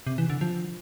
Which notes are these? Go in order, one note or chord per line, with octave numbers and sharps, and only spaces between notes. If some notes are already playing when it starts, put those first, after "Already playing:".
C3
E3
D3
F3